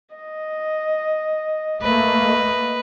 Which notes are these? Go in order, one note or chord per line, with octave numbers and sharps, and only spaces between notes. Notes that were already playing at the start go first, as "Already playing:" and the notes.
D#5
A3 A#3 B4 D#5